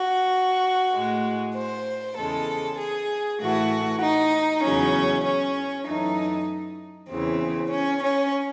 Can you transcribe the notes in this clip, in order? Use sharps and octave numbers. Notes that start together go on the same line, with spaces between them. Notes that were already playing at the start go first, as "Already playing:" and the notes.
Already playing: F#4
A2 G#3
C5
E2 C#3 G#3 A4
G#4
A2 E3 A3 F#4
D#4
E2 C#3 F#3 C#4
C#4
F#2 E3 A3 D#4
E2 C#3 E3 C4
C#4
C#4